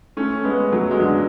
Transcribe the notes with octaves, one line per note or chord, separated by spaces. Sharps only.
A3 C#4
G#3 B3
F#3 A3
G#3
D3 F#3